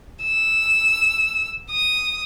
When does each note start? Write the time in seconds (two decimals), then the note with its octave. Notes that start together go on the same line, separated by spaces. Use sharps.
0.23 E6
1.71 D#6